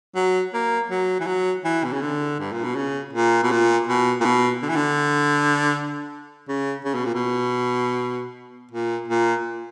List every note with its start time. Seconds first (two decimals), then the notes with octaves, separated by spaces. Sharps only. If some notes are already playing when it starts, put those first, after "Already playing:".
0.15 F#3
0.54 A#3
0.90 F#3
1.20 E3
1.27 F#3
1.65 E3
1.85 B2
1.93 C#3
2.02 D3
2.40 G2
2.52 A#2
2.64 B2
2.76 C#3
3.13 A#2
3.43 B2
3.51 A#2
3.87 B2
4.21 A#2
4.25 B2
4.62 D3
4.69 E3
4.76 D3
6.49 C#3
6.85 C#3
6.95 B2
7.05 A#2
7.15 B2
8.71 A#2
9.08 A#2